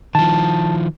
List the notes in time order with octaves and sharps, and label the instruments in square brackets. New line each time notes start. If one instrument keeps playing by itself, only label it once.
[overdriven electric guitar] D#3 F3 [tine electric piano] A5